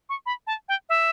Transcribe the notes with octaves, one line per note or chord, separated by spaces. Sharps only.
C#6
B5
A5
G5
E5